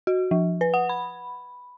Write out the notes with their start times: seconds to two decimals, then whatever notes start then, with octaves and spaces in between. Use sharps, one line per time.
0.07 F#4
0.31 F3
0.61 B4
0.74 F#5
0.89 B5